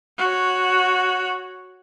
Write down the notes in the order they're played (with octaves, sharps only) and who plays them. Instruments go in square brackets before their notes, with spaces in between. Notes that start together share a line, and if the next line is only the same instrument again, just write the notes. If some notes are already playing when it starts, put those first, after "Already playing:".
[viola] F#4 C#5